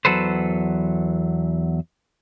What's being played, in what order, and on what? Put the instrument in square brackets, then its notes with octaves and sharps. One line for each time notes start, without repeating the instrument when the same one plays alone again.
[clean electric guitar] E2 F#3 A4 B4 C5